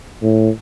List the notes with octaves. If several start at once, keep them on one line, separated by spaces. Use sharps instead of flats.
A2